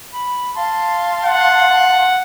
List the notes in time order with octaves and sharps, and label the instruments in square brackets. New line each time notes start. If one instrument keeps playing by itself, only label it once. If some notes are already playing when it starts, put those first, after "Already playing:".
[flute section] B5
F5 A5 C6
[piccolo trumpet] F#5